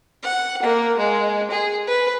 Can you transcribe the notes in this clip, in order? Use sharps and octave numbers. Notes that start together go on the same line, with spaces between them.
F#5
A#3
G#3
G#4
B4